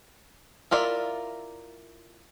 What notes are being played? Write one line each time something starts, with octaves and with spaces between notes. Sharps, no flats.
E4 F4 A#4 D5 E5